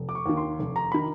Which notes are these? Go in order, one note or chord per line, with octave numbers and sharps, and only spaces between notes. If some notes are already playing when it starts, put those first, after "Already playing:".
Already playing: F1
D6
C#6
D#2 D#3
C6
F1
A#5
D#3 B5